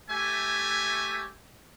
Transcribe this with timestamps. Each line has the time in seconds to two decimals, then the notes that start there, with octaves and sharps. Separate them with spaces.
0.10 A3 G4 C#5 E5 G#5